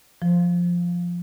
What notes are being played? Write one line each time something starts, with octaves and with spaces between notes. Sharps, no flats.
F3